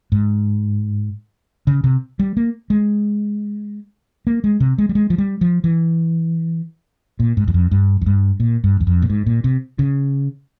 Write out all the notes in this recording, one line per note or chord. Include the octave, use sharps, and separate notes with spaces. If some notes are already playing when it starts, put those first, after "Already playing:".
G#2
C#3
C3
G3
A#3
G#3
A#3
G#3
C3
G#3
G3
G#3
F3
G3
F3
E3
A#2
G#2
E2
F2
G2
F2
G2
A#2
G2
E2
F2
A#2
G#2
A#2
C3
C#3